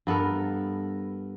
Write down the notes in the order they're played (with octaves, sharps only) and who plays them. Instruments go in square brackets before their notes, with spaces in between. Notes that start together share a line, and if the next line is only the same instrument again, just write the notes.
[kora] G2 B3 A4 A#4